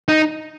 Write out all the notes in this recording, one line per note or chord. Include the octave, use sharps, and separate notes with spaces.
D#4